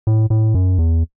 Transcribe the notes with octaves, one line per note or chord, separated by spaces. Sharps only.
A2
A2
F#2
E2